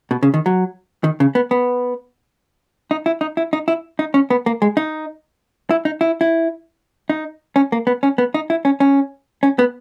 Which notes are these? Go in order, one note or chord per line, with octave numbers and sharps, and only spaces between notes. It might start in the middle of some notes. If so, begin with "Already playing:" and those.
B2
C#3
D#3
F#3
D#3
C#3
B3
B3
D#4
E4
D#4
E4
D#4
E4
D#4
C#4
B3
A#3
G#3
D#4
E4
D#4
E4
E4
D#4
C#4
A#3
B3
C#4
B3
D#4
E4
C#4
C#4
C#4
B3